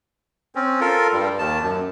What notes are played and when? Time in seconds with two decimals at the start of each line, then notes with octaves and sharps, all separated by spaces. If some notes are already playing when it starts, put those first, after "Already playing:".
0.55 C4 C#4
0.81 F4 A4 A#4
1.13 G2 G3
1.39 D#2 D#3 A5
1.62 F#2